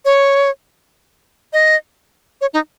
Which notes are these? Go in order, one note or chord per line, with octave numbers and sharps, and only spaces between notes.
C#5
D#5
C#5
D#4